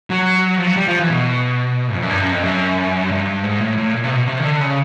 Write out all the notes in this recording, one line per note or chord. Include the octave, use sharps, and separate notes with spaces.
F#3
F3
F#3
G3
F3
E3
B2
F2
F#2
G2
F#2
F2
F#2
G2
G#2
A2
A2
A#2
C3
B2
C3
D#3
D3
C#3